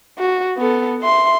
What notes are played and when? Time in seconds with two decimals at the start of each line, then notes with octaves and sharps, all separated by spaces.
0.19 F#4
0.58 B3 A4
1.02 E5 C6